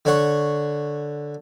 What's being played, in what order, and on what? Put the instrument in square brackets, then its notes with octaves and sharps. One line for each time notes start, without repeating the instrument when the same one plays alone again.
[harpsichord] D3 C#5 F#5 C#6